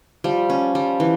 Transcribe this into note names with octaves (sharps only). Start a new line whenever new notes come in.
F3 G3
C#4
G3
E3